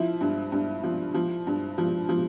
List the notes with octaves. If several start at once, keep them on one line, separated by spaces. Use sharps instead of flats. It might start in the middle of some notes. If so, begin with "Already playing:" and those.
Already playing: F3 E4
G2
G2
F3
F3
G2
F3
F3